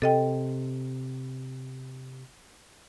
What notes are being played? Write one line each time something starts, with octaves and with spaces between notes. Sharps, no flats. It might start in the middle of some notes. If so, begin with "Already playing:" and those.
C3 A4 D#5 G5